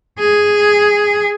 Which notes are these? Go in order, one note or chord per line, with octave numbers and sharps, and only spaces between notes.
G#4